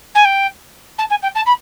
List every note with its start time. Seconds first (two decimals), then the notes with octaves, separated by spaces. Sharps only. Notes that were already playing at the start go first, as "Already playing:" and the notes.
0.14 G#5
0.24 G5
0.98 A5
1.10 G#5
1.22 G5
1.35 A5
1.46 B5